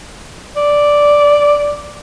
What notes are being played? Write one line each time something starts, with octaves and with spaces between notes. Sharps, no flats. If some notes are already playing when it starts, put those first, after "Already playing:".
D5